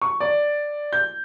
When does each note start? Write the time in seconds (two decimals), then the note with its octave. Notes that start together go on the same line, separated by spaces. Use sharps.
0.02 C#6
0.20 D5
0.93 G6